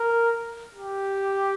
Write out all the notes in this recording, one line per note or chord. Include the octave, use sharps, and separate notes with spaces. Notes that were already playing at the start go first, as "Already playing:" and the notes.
Already playing: A#4
G4